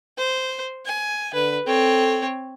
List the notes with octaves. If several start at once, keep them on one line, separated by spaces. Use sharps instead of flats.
C5
G#5
D3 B4
C4 A4 C#5